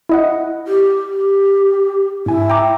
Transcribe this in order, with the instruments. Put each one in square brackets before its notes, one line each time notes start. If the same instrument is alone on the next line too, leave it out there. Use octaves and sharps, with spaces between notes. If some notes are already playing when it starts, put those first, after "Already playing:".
[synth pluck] E4 D#5 F#5
[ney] G4
G4
[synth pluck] G#2 G#5 [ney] E4
[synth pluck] G5 A#5 D6